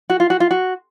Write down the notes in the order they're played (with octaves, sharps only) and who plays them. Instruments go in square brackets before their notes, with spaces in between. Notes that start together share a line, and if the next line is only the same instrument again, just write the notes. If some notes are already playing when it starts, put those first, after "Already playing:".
[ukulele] F#4
F4
F#4
F4
F#4